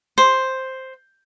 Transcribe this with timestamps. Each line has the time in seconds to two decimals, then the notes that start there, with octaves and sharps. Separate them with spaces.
0.18 C5